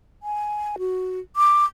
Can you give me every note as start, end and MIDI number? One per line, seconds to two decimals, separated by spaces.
0.23 0.76 80
0.79 1.19 66
1.36 1.65 86